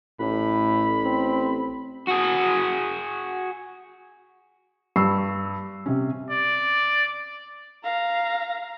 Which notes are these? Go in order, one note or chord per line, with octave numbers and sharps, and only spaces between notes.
A1 A2 B5
C4
F#4 G#4
G2 C#6 E6 C7
C3 C#4
D5
F5 A#5